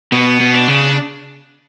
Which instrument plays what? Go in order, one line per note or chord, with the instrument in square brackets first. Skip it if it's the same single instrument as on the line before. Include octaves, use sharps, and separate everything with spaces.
[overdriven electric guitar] B2 [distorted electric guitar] B3
[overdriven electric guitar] B2
[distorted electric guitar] D4
[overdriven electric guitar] C#3